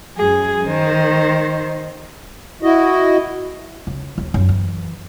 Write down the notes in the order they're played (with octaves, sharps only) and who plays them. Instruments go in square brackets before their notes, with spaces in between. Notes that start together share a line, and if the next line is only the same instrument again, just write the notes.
[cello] F#2 G#4
D#3 C5
[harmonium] E4 F#4 D#5
[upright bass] C#2
D#2
F#2
E3